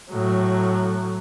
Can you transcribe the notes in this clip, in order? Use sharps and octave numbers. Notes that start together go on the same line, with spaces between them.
A2 F#3